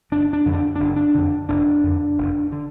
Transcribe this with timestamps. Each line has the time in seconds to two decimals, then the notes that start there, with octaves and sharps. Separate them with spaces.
0.12 F#1 D4
0.33 D4
0.46 F2 D3
0.53 D4
0.76 F#1 D4
0.96 D4
1.14 F2 D3
1.49 F1 D4
1.83 F2 D3
2.18 F1
2.52 D3